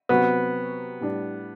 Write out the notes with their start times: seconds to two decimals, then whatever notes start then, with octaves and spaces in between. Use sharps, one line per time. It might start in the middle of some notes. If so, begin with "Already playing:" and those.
0.09 C3 F#3 B3 C4 F#4
1.01 A2 G3 D4